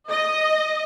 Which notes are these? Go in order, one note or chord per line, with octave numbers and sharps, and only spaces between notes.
D#5